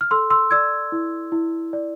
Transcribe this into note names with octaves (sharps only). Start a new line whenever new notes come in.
F6
A4 C6 E6
C6 E6
D5 E6 G#6
E4
E4
D5